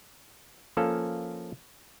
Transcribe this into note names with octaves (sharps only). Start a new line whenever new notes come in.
F3 A#3 C#4 A4 F5